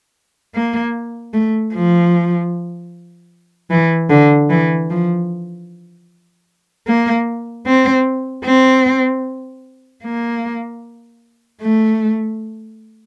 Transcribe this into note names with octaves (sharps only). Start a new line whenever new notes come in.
A#3
A3
F3
E3
D3
E3
F3
A#3
C4
C4
A#3
A3